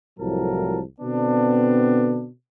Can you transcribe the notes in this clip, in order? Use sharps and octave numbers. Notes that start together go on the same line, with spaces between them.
C2 A2 F3 F#3 A#4 A5
B2 D3 B3 C4 D4